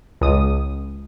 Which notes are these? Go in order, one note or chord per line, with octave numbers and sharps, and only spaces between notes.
C#2 D#6